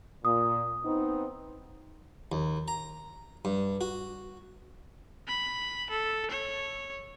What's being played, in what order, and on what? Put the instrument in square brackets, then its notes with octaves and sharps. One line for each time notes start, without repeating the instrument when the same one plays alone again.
[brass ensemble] A#2 [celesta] D#6
[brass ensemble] B3 C4 D#4
[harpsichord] D#2
A#5
G2
F#4
[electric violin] B5
A4
C#5